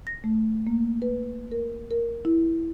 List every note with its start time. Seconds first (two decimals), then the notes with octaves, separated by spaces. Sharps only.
0.07 A#6
0.24 A3
0.67 A#3
1.02 B4
1.52 A#4
1.91 A#4
2.25 E4